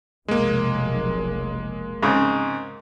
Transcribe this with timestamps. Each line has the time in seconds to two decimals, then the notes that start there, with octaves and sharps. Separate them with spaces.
0.28 F1 B1 G#3 A#3
2.03 G#2 C#3 C4